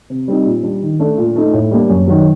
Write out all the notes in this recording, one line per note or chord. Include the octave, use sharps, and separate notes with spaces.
C3
G3 C4 D#4
A#2
G3 D4
D#3
A3 D4
A#2
A3 D#4
A2
G3 A#3 D4
F#2
D#3 F#3